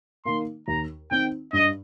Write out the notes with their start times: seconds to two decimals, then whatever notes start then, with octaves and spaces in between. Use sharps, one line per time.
0.25 D#3 A#3 C6
0.68 D#2 A#5
1.11 D#3 C4 G5
1.53 G2 D#5